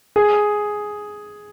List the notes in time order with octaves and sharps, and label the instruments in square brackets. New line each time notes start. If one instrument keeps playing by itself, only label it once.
[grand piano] G#4